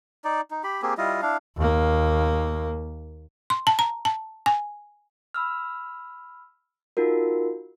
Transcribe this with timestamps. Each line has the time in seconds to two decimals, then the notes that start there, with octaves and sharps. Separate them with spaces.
0.25 D#4 D5
0.51 D#4
0.64 G4 B5
0.82 A#3 C4 G4 G#4
0.98 G3 E4 F4 D#5
1.22 D4 E4 F5
1.57 D#2 A#3
3.50 C6
3.67 A5
3.79 A#5
4.05 A5
4.46 G#5
5.34 B5 E6 F6
6.97 D#4 F4 F#4 A#4